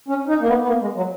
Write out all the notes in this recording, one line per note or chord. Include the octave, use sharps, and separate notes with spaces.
C#4
D#4
A#3
B3
B3
A#3
G#3
F#3